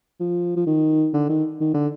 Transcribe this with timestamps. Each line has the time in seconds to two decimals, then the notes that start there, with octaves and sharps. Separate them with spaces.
0.20 F3
0.56 F3
0.67 D#3
1.14 D3
1.29 D#3
1.61 D#3
1.74 D3